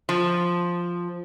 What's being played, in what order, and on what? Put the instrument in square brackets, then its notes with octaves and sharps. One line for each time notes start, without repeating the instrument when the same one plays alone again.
[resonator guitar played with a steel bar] F3